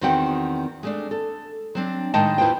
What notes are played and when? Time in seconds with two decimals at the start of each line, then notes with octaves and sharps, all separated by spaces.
0.01 E2 D#3 C4 F#4 F#5 G5
0.83 G#3 A3 D4
1.11 A4
1.75 F#3 C4 D4
2.14 A2 D#3 G#3 D#5 G5 A5
2.38 D#2 E4 F4 B4 C5 G5